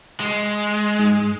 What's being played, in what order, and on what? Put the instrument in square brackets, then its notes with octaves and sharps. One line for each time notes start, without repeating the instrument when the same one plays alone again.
[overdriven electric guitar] G#3
[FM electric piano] G#2